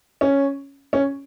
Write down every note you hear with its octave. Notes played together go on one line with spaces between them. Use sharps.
C#4
C#4